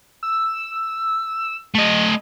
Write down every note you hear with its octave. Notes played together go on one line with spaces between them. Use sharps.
E6
A3 D#5